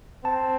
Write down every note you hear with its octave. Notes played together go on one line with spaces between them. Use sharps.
C4 A5